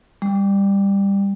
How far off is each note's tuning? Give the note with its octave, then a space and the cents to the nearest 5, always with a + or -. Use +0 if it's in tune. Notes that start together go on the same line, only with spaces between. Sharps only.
G3 +15